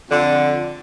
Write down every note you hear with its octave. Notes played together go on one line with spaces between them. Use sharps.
F2 D3